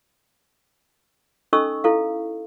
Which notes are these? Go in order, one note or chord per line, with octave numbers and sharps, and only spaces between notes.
C#4 D#4 A4 D#5 C#6 E6
E4 A4 F5